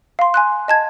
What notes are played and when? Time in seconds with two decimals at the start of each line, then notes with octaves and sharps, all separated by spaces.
0.19 F5 C6
0.34 G#5 C6 F#6
0.68 D#5 A5 G#6